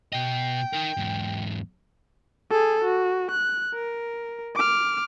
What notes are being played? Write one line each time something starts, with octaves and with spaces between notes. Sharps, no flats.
B2 D#5 G5
D#4 A#4
E2 G#2
G#4 A4
F#4
F#6
A#4
D6 F6